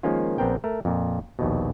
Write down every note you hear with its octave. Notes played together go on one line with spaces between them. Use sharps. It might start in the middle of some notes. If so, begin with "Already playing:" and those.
D#3 F3 G#3 A#3 C#4 F4
A#1 B3 C4 A#4 G5
A3 A#4
F2 A#2
A#1 D#2 B2